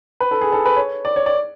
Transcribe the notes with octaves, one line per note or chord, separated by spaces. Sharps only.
B4
A4
G#4
A4
B4
C#5
D5
C#5
D5